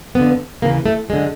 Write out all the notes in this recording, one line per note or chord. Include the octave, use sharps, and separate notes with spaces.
F2 D3 B3
D#2 C#3 E3 A#3
A3
F#2 D3 G#3